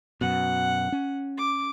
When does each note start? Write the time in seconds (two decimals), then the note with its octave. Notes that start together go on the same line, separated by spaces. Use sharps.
0.21 F#2 B2 F#5
0.92 C#4
1.38 D6